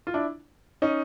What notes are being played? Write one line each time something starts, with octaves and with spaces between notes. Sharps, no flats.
F4
D4 E4
C#4 D#4